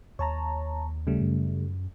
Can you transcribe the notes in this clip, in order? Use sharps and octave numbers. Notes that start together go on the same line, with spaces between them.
D#2 C#5 A5 A#5
C#3 G3 A3
F#2